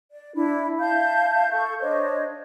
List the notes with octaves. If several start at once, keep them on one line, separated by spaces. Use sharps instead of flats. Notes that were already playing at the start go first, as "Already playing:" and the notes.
D5
D4 E4
E5 F5 A5 G6
A4 C#6 G6
D4 C5 C#5 D#5